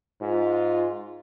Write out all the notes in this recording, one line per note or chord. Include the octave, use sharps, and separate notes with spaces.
G#2 F4